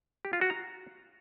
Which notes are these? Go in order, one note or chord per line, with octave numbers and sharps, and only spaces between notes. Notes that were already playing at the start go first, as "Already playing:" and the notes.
G4
F4
F#4
A#5